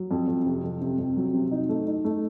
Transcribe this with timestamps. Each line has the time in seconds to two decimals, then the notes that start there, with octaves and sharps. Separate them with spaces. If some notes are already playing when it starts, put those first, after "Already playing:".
Already playing: F#3
0.11 F2
0.28 F2
0.46 C3
0.63 F2
0.81 C3
0.99 F2
1.16 F#3
1.34 C3
1.51 D#4
1.69 A3
1.87 D#4
2.05 A3